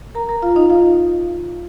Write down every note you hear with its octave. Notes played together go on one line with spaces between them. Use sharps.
A#4 A#5
A#4 A#5
F4 F5
D#4 D#5
F4 F5